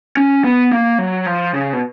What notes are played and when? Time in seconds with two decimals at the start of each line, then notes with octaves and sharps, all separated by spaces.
0.17 C#4
0.44 B3
0.72 A#3
0.98 F#3
1.26 F3
1.53 C#3
1.73 B2